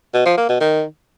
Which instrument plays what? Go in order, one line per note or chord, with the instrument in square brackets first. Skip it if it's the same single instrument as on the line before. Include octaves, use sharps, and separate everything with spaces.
[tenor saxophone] B2
F3
A#3
B2
D#3